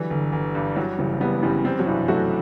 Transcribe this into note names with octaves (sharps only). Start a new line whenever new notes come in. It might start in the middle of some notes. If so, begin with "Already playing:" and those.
Already playing: D3 E3 F#3 G3
G1
G1
G2
E3 F#3 G3
F#1 E3 G3
E3 G3 B3
F#2 E3 G3
E3 G3 C4
F#3
G2 C3 E3
F#3 A3 F#4